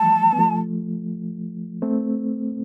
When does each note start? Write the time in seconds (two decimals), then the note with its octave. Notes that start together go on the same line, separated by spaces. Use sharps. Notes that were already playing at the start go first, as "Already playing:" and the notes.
Already playing: E3 F3 G3 A3 A5
0.33 B3
0.38 F3 A3
1.82 A3 C4